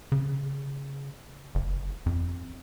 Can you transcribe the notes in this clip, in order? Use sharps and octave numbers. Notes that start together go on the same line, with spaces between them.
C#3
F#1
F2